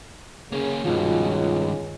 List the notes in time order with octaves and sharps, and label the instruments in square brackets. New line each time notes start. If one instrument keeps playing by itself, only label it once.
[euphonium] C#3 [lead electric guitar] A#3 C#4 [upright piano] C#5
[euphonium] C#2 [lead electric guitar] G2 D#3 [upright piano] B2 F3 F4